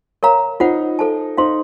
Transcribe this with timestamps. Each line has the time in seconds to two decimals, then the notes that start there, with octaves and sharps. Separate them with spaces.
0.23 A#4 C#5 F5 A#5
0.60 D#4 F4 C5 F#5
0.99 A4 C5 F5 A5
1.37 D#4 C5 F5 C6